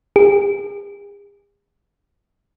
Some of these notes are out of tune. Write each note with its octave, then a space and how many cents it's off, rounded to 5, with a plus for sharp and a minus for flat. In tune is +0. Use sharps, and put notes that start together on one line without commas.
G#4 -45